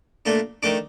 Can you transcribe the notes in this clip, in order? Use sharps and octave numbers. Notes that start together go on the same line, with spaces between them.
A#2 A3 D4
D#3 A3 D4 D6